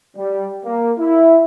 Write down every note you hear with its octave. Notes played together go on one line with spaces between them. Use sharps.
G3
A#3
E4